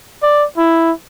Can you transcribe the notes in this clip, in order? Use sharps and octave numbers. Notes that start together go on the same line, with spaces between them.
D5
E4